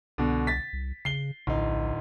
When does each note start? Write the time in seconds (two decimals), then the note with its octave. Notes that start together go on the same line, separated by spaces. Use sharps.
0.18 C2 B2 D3
0.47 A6 B6
0.73 C2
1.05 C#3 C7 G7
1.47 D1 A#1 D#4